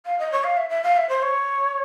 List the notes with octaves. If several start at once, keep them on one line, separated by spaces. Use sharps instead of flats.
F5
D#5
C#5
F5
E5
E5
F5
E5
C5
C#5